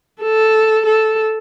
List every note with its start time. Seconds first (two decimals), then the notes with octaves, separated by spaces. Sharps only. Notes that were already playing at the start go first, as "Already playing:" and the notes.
0.22 A4
0.86 A4